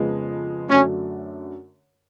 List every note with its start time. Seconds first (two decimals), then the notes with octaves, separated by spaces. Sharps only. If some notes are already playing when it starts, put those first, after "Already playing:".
Already playing: F2 C#3 F3 G#3 B3
0.70 F#2 D3 F#3 A3 C#4 D4